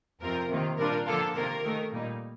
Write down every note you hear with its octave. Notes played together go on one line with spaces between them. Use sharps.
F2 C3 F3 C4 F4 A#4
C3 D#3 A#3 F4
A#2 G3 D4 F4 A#4
D3 F3 A#3 D4 F4 A4
C3 D#3 A#3 F4 A#4
D#3 A3 D#4
A#2 G3 A#3 D#4